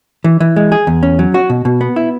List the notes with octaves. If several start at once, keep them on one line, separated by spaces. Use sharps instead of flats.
E3
E3
G#3
G#4
E2
C#4
F#3
F#4
B2
B2
B3
E4